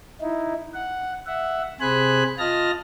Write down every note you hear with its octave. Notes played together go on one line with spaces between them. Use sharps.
D#4 E4
F#5
E5 F#5
C3 G#4 C5 G#5 B5 F#6
F4 D#5 A5 F6 A#6